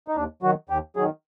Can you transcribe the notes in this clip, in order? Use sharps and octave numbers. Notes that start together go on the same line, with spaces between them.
D#4
D#2 D4
D#3 F#3 F#4
D#2 G4
D#3 F#3 G#4